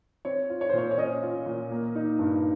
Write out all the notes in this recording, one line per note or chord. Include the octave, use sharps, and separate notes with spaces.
C4 C#5
F4
C#5
C5
A#2 C#5
C#5
C#4 D#5
F4
A#2
A#3
D#4
G2